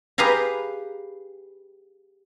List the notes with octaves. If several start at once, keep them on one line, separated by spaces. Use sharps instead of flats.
G4 G#4 B4 F5 G#5 A#5